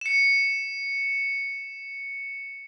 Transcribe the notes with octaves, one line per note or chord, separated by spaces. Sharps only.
C#7 E7